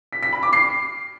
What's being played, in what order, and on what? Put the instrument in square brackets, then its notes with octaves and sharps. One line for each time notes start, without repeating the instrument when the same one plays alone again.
[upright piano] B6
B6
B5
D6
C7